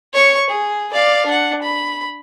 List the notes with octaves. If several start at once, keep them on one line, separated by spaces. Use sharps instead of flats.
C#5 C#6
G#4
D5 F5
D4 F#5
B5